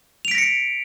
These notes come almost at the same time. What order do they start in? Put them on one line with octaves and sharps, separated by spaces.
F7 D7 B6 A#6 C#7